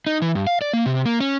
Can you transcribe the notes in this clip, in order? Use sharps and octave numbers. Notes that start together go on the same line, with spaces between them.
D#4
E3
G2
F5
D5
A#3
C3
A#3
C#4